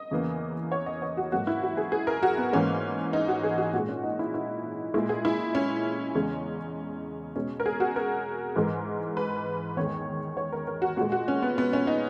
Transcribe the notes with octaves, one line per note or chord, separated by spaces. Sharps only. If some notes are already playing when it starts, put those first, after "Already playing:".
Already playing: D#5
E2 C#3 E3 A#3
C#5
D#5
C#5
F#4
G#2 F#3 A#3 F#4
E4
F#4
G#4
G#4
A#4
F#4
B3
G#2 E3 A#3 C#4
D#4
F#4
G#4
F#4
A#2 G#3 F#4
C#4
D#4
E4
E4
A#2 G#3 E4
G#4
E4
C#4
E2 C#3 G#3
B2 G#3 C#4
A#4
G#4
F#4
A#4
G#2 E3 G#3
B4
E2 D#3 G#3 C#5
C#5
A#4
A#4
F#4
A#2 G#3 F#4
F#4
C#4
B3
B3
C#4
D#4